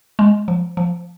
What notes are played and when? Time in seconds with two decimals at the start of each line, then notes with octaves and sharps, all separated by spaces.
0.19 G#3
0.48 F3
0.77 F3